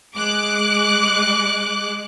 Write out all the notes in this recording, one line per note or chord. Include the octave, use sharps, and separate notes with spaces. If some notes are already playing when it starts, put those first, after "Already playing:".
G#3 D6 F#6